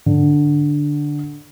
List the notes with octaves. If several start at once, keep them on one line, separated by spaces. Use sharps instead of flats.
D3